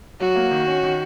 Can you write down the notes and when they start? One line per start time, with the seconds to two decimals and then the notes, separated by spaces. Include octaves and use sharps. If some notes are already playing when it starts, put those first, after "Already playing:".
0.20 F#3 F#4
0.36 A#3
0.51 D#3
0.67 C#4
0.83 D#3